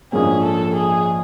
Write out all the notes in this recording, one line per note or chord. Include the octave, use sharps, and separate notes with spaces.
A#1 G#2 F3 A#3 C#4 G#4
A4
G#4